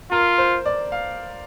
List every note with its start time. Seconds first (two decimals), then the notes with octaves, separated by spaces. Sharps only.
0.11 F4 A#4
0.38 C5
0.66 D5
0.92 F5